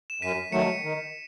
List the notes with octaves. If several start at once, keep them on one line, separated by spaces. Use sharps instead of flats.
E7
F#2 B6 D#7
D#3 F#3 A3 C#7 E7
D#3